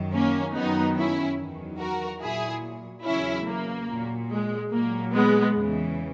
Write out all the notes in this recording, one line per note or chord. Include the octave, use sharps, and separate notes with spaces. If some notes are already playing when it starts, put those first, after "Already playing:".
Already playing: F#2 D#3 F#3
A#3 C#4
F#2 D#3 F#3 B3 D#4
C#4 E4
E2 D#3 F#3
F#4 A#4
A#2 F#3 E4 G#4
E2 C#3 F#3 C#4 E4
A#3
A#2 F#3
G#3
A#2 F#3 A#3
G#3 B3
E2 C#3 E3